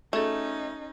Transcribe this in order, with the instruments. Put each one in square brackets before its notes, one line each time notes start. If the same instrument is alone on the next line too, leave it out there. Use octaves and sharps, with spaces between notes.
[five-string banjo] A3 [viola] C#4 D#4 [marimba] F#4 G#4 A4